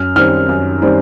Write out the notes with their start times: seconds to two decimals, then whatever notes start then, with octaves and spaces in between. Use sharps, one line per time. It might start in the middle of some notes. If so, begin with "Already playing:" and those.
Already playing: F#2 F6
0.16 D#3 G3 C4 F6
0.49 F#2
0.82 D#3 G3 C4